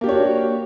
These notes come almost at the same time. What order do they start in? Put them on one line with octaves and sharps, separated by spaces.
A#3 G4 D4 C#5 F#4